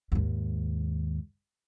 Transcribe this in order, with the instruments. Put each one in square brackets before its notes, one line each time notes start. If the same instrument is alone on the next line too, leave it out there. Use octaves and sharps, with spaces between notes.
[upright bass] D#2 G#2